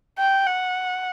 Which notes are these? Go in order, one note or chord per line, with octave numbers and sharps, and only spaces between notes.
G5
F#5